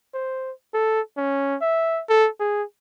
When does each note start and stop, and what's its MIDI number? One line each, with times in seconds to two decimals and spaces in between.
0.14 0.52 72
0.73 1.00 69
1.17 1.56 61
1.61 2.01 76
2.09 2.28 69
2.40 2.63 68